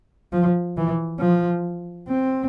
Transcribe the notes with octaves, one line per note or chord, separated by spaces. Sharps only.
F3
E3
F3
C4